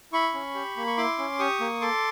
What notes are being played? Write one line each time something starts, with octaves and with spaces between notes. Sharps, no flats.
E4 B5 C#6
C#4
G4
A#3
C#6
E4 C6 D6
C#4
G4 C#6 D#6
A#3
A4 C6 D6